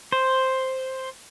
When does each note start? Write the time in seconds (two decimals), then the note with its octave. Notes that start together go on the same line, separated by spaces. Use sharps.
0.12 C5